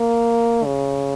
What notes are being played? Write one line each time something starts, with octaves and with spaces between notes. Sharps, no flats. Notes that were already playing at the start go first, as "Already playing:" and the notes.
Already playing: A#3
C#3